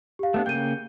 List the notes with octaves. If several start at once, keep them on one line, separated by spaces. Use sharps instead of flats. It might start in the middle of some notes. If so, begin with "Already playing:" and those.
G4 F5
A3 B3 D4
C#3 A#3 G5 G6 D#7